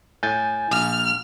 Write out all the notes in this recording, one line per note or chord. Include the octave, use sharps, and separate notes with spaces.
A2 G#5 G6 A6
A#1 F6